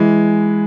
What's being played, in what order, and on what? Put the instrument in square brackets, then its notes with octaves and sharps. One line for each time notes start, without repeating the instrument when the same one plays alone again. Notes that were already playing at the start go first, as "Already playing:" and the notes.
Already playing: [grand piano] E3 [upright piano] G#3